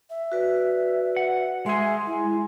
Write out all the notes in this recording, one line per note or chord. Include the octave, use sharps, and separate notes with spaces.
E5
F#4 B4 D5
F#5
G#3 G#4 E5 G#5 C6
E4